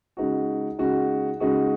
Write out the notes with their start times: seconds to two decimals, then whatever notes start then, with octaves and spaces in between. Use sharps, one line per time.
0.17 C#3 G#3 D#4 F#4
0.79 C#3 G#3 D#4 F#4
1.40 C#3 G#3 D#4 F#4